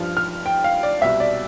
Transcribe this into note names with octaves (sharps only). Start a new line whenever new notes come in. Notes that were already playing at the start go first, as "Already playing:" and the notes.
Already playing: G2 F3 F6
F6
G5
F5
D5
C2 B2 E5
D5